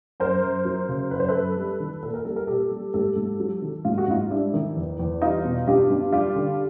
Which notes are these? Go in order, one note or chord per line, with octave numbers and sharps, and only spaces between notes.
F#2 A#4 C5
F#2
F#3
C#3
F#2 B4
C5
A4 B4
F#2
G3
D#3
A#2 A4
A#4
G3 A4
A#4
A#2 G4 A4
G3
G#2 G4 A4
G#2
F#3
D#3
G#2 F4
F#4
G#2 D#4 F4
G3 D4 E4
D#3
E2
E2
G3 D#4 F4
B2
G2 F4 G4
G2
G3 F4 G4
D3